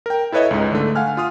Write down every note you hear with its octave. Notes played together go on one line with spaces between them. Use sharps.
A#4 G5
E4 A4 B4 C#5 D#5 E5
C#2 G#2
D3 A3
F5 F#5 G#5 F6
F4 C6 D#6 F6